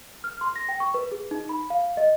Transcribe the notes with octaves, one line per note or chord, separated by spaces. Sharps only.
F6
C6
A#6
G5
C#6
B4
G#4
D#4
B5
F5
D#5